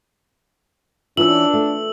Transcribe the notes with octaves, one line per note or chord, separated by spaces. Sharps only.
E3 C#4 D4 F4 E6 F#7
A3